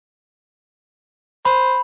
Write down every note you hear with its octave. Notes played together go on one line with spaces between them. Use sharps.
C5 B5